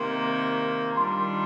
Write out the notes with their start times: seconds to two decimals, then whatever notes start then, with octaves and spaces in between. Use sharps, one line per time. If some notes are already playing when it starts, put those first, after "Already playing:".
Already playing: C3 D#3 A#3 C6
0.92 A#5
0.97 D#3 G3 D4 F4 C6